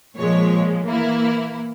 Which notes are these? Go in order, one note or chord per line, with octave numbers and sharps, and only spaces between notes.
A#2 F3 G#3 C#5
E3 A#3 E4